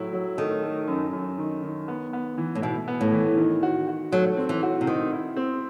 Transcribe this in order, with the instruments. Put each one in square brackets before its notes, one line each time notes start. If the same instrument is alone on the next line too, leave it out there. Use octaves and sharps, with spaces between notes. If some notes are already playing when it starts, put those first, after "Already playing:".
Already playing: [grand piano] A2 F#3 E4
F#3
[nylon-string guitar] D#3 [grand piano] A3
[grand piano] A3
F#2
F#2
D#3
D#3
B3
B3
E3
[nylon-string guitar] A2
[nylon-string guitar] B2 [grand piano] E4
[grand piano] B3
[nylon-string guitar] A2
[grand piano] E3
D#3
F#4
F#4
[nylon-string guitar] F#3 [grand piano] A3
[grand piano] C4
[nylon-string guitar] E3
[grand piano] F#4
[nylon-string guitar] C3
[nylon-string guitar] D#3 [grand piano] C4
[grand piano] E4
C4